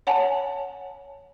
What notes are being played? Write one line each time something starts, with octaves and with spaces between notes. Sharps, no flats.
C#5 F#5 G#5 A5